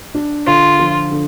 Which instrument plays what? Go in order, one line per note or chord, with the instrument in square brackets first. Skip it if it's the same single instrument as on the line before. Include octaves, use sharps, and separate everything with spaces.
[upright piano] D4
[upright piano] D3 [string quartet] F4
[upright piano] F3
D3